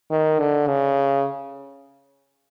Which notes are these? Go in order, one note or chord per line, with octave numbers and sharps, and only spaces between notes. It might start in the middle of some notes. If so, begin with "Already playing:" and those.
D#3
D3
C#3